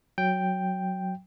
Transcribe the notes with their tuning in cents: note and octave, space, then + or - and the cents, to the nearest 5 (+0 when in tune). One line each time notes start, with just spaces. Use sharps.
F#3 +0 G5 +0